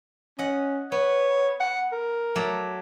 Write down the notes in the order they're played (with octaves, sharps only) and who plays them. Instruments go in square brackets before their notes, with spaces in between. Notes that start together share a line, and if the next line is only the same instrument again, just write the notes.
[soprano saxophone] C#4 [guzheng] D#5 F#5
[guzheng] B3 [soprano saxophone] C#5
[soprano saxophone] F#5
A#4
[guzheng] F#3 A3 D5